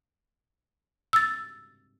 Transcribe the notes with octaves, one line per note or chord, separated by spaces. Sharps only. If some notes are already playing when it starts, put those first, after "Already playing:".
E6 A6